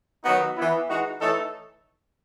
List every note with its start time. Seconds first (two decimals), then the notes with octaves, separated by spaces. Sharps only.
0.25 D#3 F#3 B3 D#4 F#4
0.57 E3 B3 E4
0.88 E3 G#3 D#4 F#4
1.19 E3 A3 D#4 A4 C#5